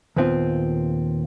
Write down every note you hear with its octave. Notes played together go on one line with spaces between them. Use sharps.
D#2 A#2 B3 C4 E4 F4